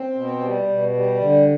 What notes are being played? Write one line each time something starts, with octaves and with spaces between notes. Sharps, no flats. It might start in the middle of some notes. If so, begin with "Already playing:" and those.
Already playing: C4
B2
G3
B2
G3
D3